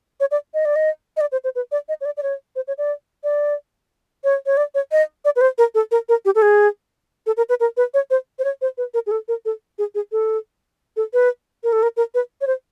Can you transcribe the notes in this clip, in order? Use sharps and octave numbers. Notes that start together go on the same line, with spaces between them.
C#5
D5
D#5
D5
D#5
D#5
D5
C5
C5
B4
D5
D#5
C#5
D5
D5
C#5
C5
C#5
D5
D5
C#5
C#5
D5
C#5
D#5
D5
B4
C5
A#4
A4
A#4
A#4
G4
A4
G#4
A4
A#4
B4
A#4
B4
C#5
C5
C5
C#5
C5
B4
A#4
G#4
A4
A#4
A4
G#4
G#4
A4
A4
B4
A#4
A4
A#4
A#4
B4
C#5
C5